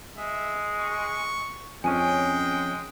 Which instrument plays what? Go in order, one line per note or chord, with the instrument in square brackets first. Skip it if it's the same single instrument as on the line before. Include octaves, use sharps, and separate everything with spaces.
[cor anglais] G#3 [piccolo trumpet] E5
[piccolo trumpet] C#6
[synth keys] F2 C#4 [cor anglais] G#3 [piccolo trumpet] G5 [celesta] G#5 D#7